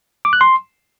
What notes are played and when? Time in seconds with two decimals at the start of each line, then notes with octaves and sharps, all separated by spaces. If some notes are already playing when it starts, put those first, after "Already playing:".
0.25 D6
0.33 F#6
0.41 C6